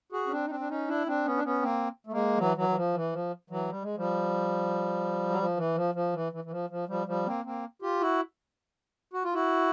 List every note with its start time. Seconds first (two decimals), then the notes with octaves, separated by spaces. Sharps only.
0.12 F#4 G#4
0.27 C#4
0.31 C4 D4
0.46 D#4
0.49 C4 D4
0.60 D4
0.69 C#4 D#4
0.88 D4 E4
1.06 C4 D4
1.26 B3 C#4
1.37 D4
1.44 B3 C#4
1.62 A#3 C4
2.07 A3
2.12 G#3 A#3
2.38 E3 F#3
2.56 E3 F#3
2.69 E3
2.76 F3
2.94 E3
3.12 F3
3.50 E3 F#3
3.70 G3
3.82 G#3
3.96 F3 G3
5.29 F#3
5.39 F3
5.57 E3
5.75 F3
5.95 F3
6.14 E3
6.32 E3
6.44 E3
6.51 F3
6.70 F3
6.88 F3 G3
7.07 F3 G3
7.26 A#3 C4
7.44 A#3 C4
7.82 F4 G4
8.01 E4 F#4
9.13 F#4
9.24 F4
9.33 E4 F#4